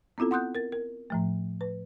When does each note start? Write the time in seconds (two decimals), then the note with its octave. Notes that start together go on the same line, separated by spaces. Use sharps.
0.18 B3 C4 E4 F4 A4
0.31 F#5 C6 D#6 F#6 G6
0.55 A#4 A6
0.72 A#4
1.10 A2 F3 A3
1.61 B4